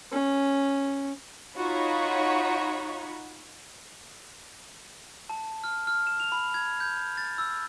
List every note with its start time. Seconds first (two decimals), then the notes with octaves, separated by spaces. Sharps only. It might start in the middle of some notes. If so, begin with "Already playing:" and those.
0.12 C#4
1.57 D#4 F4 F#4 C#5 B5 C#6
5.29 A5
5.64 F6
5.87 F6
6.07 E7
6.20 F7
6.32 B5
6.54 G#6
6.80 G6
7.18 A6
7.38 E6